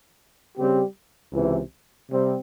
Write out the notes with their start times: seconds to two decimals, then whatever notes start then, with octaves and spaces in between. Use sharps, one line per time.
0.56 C#3 G3 C4 G4
1.32 C#2 C3 E3
2.09 C3 G3 C4